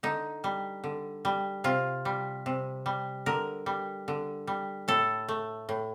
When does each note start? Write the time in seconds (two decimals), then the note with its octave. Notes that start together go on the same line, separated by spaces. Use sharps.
0.03 D3 D#4
0.44 G3
0.84 D3
1.25 G3
1.64 C3 F4
2.05 G3
2.46 C3
2.86 G3
3.26 D3 A#4
3.66 G3
4.08 D3
4.47 G3
4.88 A2 A4
5.29 A3
5.69 A2